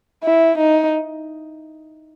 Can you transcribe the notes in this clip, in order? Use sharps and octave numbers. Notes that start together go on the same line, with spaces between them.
E4
D#4